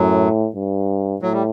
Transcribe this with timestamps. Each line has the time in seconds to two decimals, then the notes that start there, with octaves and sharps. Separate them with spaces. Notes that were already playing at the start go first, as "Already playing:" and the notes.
Already playing: F#2 A2 F#3
0.56 G2
1.22 A2 F#3
1.32 G3